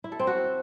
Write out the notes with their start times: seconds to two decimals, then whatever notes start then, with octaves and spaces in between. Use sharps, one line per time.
0.04 E4
0.12 A4
0.19 C4
0.27 F#4